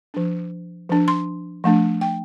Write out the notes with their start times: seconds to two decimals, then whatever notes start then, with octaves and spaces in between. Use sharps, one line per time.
0.14 F3 D4
0.90 F3 D4
1.08 C6
1.64 F3 A3 D4
2.01 G5